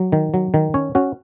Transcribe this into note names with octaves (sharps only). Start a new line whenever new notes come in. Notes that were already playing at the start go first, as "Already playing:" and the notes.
Already playing: F#3
D#3
F#3
D#3
C#4 C#5
C#4 F#4